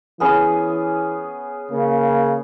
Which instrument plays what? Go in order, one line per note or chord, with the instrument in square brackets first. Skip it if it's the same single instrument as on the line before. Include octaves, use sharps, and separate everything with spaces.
[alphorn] E3 [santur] B3 C#4 G#4
[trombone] C#3 [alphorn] A#3